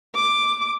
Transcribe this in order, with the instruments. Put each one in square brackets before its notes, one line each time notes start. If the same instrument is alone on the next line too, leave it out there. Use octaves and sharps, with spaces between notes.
[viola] D6